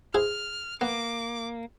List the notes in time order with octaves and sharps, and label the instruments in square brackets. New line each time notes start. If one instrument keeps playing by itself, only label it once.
[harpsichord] E4 G#4 C5 [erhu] F6
[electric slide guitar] A#3 [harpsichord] B3 [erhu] D6